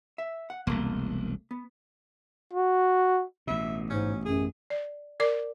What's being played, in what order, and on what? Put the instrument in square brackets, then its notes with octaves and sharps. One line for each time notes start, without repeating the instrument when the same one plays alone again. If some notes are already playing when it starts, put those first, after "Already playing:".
[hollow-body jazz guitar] E5
F#5
[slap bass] E1 C2 [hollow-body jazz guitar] A3 A#3
[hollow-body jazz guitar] B3
[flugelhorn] F#4
[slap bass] A1 B2 [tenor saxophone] E5
[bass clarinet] G#2 [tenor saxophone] C#4
[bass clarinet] F#2 [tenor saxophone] G#4
[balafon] D5
A#4 D5 D6